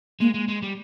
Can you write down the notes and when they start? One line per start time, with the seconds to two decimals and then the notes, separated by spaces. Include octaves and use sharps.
0.20 G#3 A#3
0.34 G#3
0.48 G#3
0.62 G3